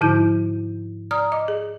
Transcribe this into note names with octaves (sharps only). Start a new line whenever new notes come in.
G#2 D3 F3 D#4 E4 G6
D5 A#5 D#6 F6
D#5 D6
G#4